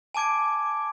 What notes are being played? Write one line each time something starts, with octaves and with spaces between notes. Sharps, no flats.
G#5 A5 D6 G#6 D7